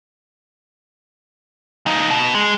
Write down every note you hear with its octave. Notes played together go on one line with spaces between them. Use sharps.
F3 D#4
B2
G#3